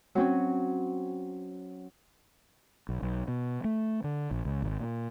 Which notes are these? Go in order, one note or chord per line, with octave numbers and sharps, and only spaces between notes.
F#3 C4 C#4
B1
B1
B2
A3
D3
A#1
C#2
G#1
A#2